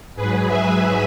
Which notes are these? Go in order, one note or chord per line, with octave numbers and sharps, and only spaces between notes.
G#2 F#3 G#4 B4
E5 G#5